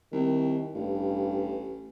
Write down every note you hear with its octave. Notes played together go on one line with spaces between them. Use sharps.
C2 D#3
A1 G2